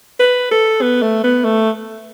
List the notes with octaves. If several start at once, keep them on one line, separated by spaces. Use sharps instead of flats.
B4
A4
B3
A3
B3
A3